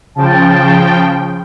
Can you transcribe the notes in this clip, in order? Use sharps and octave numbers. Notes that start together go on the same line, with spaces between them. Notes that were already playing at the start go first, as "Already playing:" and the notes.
C#3 F3 G5 A5